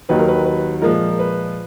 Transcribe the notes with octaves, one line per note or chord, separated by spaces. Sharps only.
D#2 D#3 F#3 B4
A#4
B4
B4
A#2 F3 G#3 A#4
B4